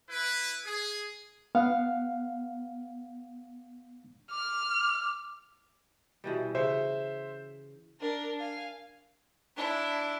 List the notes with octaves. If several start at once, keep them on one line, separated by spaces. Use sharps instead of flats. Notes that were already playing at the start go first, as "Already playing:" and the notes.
E4 B4
G#4
B3 F5 F#5
D6 F6
B2 E3 G3
C#3 C5 E5
D4 A#4
F5 G#5
D4 E4